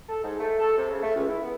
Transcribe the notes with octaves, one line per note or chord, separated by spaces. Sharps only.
A4
G#2
A3
A4
C3
C#3
A3
C#2
E4
B3